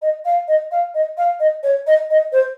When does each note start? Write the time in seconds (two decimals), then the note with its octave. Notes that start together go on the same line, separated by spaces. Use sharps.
0.02 D#5
0.25 F5
0.48 D#5
0.71 F5
0.94 D#5
1.17 F5
1.40 D#5
1.63 C#5
1.87 D#5
2.10 D#5
2.32 C5